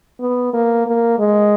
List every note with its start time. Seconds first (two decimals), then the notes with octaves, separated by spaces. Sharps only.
0.20 B3
0.53 A#3
0.86 A#3
1.19 G#3